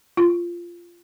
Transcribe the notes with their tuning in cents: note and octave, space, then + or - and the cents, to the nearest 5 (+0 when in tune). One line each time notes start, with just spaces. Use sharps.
F4 -10